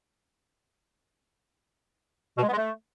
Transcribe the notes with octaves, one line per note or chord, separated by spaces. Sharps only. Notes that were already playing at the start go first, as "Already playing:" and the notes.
B2
G#3
B3
G#3
A3